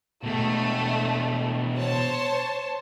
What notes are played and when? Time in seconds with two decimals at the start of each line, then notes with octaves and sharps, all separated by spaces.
0.23 B2 G#3 A3
1.77 C5 C#5 A5